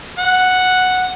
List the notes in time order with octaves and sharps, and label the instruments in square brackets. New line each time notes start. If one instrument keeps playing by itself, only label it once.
[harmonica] F#5